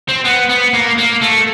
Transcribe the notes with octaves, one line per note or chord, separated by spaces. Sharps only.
C4
B3
B3
A#3
A#3
A3